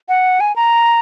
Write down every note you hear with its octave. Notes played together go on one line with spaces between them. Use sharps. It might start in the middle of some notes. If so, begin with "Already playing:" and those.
F#5
G#5
A#5